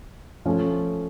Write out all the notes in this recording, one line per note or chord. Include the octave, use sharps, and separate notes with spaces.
F3 A3 C#4 F4